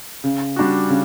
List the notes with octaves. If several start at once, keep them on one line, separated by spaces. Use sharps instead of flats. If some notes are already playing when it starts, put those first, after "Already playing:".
C#3
G3 D4 F#4
C#3